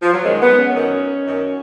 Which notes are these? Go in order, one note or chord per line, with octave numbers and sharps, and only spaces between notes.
F3
F#3
F#2 D#3 G#3
B3
C#4
F#2 D#3
F#2 D#3